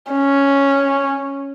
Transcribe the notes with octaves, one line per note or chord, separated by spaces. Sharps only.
C#4